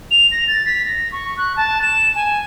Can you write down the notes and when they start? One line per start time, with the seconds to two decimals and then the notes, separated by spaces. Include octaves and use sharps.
0.11 F7
0.32 A#6
0.48 A6
0.66 B6
0.85 A#6
1.12 C#6
1.38 F#6
1.56 A5
1.82 E7
2.15 G#5